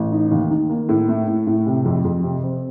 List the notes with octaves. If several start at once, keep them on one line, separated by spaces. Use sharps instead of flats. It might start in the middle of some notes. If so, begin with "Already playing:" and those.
Already playing: A1
D#4
D#2
D#3
A#3
A2
A3
A2
A2
C3
F2
F2
C3
C4